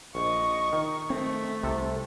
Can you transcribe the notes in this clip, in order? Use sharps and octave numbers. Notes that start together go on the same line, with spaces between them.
A#1 D#5 C#6
D#3
A3 C4
C2 C3 A4